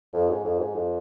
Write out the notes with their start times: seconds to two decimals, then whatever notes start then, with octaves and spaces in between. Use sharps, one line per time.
0.13 F2
0.29 G#2
0.44 F2
0.59 G#2
0.75 F2